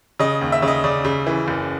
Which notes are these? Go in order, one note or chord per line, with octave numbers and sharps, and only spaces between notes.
C#3 D#5
D#2
E5
C#3
D#5
C#3 D5
C#3
E3
F#1